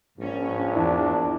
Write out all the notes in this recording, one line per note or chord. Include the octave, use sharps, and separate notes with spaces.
A#1 G#2 C#4
E2 D4 E4